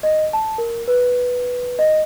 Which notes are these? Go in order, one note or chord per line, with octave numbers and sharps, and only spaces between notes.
D#5
A5
A#4
B4
D#5